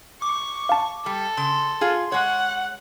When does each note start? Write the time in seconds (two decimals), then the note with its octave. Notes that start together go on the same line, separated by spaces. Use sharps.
0.22 C#6 D6
0.69 F5 A5
1.06 G3 A4
1.37 C#3 C6
1.81 F4 G#4
2.12 G#3 C#5 F#5